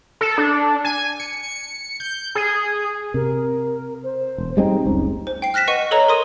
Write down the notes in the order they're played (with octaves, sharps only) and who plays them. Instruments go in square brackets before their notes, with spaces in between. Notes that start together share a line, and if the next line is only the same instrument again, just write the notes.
[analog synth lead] A4
D4
G#5
C#7
G6
G#4
[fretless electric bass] C3 [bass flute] A#4
[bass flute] C5
[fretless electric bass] E1
[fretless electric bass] G3 G#3 C4 [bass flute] D#4
[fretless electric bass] F#1 C#2 [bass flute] D#4
[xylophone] C5
G5 C7
F6 F#6 A#6 B6 E7
B4 D#5 F#5 C#6 D#7
A4 B4 C#5 D#5 A#5
A#4 C6 D#6 D#7